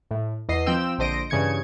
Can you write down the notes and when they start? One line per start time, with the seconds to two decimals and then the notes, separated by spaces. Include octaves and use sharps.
0.11 A2
0.49 E2 D#5 C7
0.66 F3 C4 G5 E6
0.98 A#1 D3 C5 D#5 A#6 D7
1.30 G2 C#3 E3 G#6 C#7